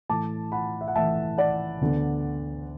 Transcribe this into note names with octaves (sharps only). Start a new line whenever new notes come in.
A2 E3 A3 A5 D6
F#5 B5
E5
F#5
A2 E3 A3 E5 A5
D5 F#5
D2 D3 B3